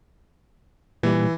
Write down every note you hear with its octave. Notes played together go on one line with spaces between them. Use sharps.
A#2 E3 G3